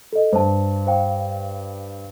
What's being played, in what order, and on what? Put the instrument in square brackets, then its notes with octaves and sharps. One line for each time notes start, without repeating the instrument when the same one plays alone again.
[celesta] A4 D#5
[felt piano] G2 [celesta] C5 A5
[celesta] C5 F5 G5